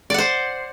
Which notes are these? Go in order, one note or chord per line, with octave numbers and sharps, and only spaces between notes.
C5 D5 F#5